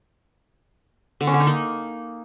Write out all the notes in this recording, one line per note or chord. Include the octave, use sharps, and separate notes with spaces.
D3
C#4
D3
D#4
A#3